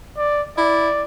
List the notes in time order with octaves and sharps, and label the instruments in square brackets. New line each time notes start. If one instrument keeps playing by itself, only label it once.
[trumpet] D5
[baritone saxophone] E4 [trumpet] D5